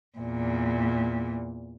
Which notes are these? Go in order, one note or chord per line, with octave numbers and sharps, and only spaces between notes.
E2 A#2